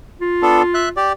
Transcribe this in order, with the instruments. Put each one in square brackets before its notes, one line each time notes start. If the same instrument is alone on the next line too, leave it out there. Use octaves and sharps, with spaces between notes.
[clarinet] F4
[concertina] B3 D4 A4
E5 F#6
G4 D5